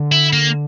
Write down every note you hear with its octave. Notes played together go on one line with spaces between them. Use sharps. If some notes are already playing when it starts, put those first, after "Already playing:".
Already playing: D3
E4
A#3